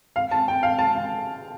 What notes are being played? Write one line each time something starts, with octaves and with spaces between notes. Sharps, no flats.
F5
A5
G5
F5
A5
F5